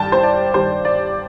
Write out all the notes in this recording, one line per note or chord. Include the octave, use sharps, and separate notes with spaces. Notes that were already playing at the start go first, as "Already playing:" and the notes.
Already playing: G2 D#3 G3 G5 A5
C5
D5
G2 D#3 G3 C5
D5